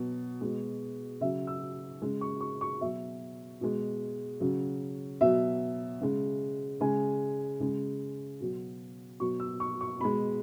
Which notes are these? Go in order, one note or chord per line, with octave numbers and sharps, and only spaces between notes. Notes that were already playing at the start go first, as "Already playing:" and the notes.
Already playing: B2 F#3
B2 G#3
C#3 F#3 E5
E6
C#3 G#3
C#6
C#6
C#6
B2 F#3 E5
B2 G#3
C#3 F#3
B2 F#3 E5
C#3 G#3
C#3 G#3 G#5
C#3 G#3
B2 F#3
B2 F#3 C#6
E6
C#6
C#6
B2 G#3 B5